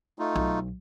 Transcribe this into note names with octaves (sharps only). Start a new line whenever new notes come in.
A3 D#4 F4
B1